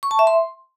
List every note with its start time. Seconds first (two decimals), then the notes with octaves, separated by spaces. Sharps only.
0.03 C#6
0.11 A5
0.19 E5
0.27 C6